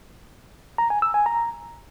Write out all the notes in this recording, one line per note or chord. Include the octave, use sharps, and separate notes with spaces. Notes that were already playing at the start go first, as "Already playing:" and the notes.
A#5
G#5
E6
G#5
A#5